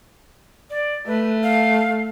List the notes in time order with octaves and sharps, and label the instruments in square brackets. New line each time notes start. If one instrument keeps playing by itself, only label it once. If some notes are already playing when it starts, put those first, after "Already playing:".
[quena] D5
[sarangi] A3 [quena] B4
[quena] F5